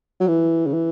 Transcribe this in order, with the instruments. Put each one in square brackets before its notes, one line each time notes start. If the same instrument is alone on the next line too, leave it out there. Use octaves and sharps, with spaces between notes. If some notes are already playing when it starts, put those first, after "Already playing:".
[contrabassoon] F#3
E3
C#3
E3